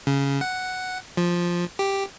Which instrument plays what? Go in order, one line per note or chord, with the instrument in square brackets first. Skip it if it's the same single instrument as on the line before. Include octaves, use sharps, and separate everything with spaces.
[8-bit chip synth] C#3
F#5
F3
G4